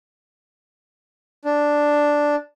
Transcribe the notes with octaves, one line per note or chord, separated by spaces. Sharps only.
D4